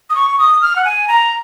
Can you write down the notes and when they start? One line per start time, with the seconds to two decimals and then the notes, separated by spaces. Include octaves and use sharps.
0.10 D#6
0.16 C#6
0.39 D#6
0.61 F6
0.76 F#5
0.85 G#5
1.08 A#5